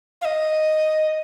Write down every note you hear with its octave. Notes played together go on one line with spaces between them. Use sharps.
F5
D#5